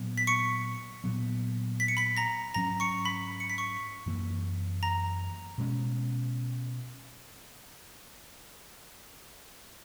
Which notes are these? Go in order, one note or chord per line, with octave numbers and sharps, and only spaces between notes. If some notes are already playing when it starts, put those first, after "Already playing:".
Already playing: A#2 F#3 B3
B6
C#6 C#7
A#2 F#3 B3
B6
C#7
B5 B6
A#5 A#6
G#2 F#3 C#4 A#5 A#6
C#6 C#7
B5 B6
C#7
B6
C#6 C#7
F#2 E3 A#3
A#5 A#6
B2 G#3 C#4